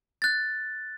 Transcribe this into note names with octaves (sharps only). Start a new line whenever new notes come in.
F#6 A6